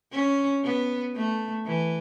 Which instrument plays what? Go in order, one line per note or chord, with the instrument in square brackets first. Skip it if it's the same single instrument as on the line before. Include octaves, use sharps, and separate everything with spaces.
[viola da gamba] C#4
B3
A3
E3